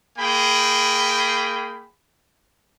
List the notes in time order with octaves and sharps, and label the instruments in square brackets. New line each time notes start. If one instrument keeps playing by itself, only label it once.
[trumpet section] A#3 G#4 G5 B5